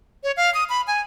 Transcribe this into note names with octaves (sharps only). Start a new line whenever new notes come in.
C#5
F5
D#6
B5
G#5